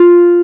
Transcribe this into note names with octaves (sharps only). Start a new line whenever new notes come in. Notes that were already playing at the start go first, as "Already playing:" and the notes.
Already playing: F4